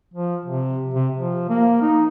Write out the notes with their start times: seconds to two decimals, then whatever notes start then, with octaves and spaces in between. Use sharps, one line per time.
0.14 F3
0.46 C3
0.94 C3
1.17 F3
1.49 A#3
1.82 D#4